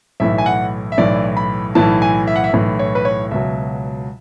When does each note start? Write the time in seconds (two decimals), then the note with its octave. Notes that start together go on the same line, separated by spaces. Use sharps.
0.20 B1 A2 E3 E5
0.38 G#5
0.46 F#5
0.92 E5
0.98 B1 A2 E3 D5
1.37 B5
1.75 B1 A2 E3 A5
2.02 G#5
2.27 E5
2.36 F#5
2.44 E5
2.53 B1 A2 E3
2.79 C#5
2.95 B4
3.05 C#5
3.31 C#2 B2 F#3 E5